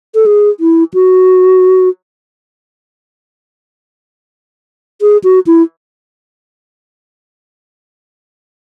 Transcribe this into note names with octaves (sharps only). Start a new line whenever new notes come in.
A4
G#4
E4
F#4
G#4
F#4
E4